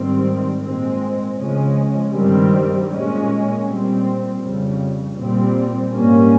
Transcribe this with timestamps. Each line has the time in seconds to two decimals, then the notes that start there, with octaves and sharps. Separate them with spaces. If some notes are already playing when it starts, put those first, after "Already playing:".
Already playing: G#2 D#3 G3 C4
0.62 A#2 G#3 C4
1.38 C#3 F3 G#3 C#4
2.13 G2 D#3 G3 C4
2.89 A#2 G#3 C#4
3.65 A#2 G3 C4
4.41 F2 C#3 G3
5.17 A#2 G3 C4
5.92 G#2 G3 A#3 C#4